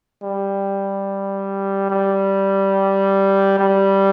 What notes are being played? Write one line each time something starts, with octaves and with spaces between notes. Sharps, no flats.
G3
G3
G3